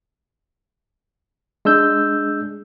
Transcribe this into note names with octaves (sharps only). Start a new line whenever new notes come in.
G#3 D4 E6 G6